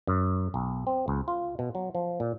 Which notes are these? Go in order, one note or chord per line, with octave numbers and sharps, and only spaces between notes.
F#2
B1
C4
C#2
F4
B2
F#3
F3
A#2